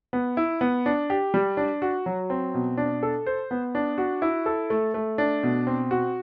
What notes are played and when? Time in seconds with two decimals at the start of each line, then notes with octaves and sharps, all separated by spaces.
0.13 B3
0.37 E4
0.61 B3
0.86 D4
1.10 G4
1.34 G3
1.57 D4
1.82 F#4
2.06 F#3
2.30 C4
2.54 B2
2.77 D4
3.03 A4
3.26 C5
3.51 B3
3.75 D4
3.98 F#4
4.22 E4
4.46 A4
4.70 A3
4.94 A3
5.18 D4
5.43 B2
5.67 C4
5.91 F#4